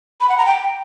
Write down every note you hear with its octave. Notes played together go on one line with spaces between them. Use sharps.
B5
F#5
A#5
G5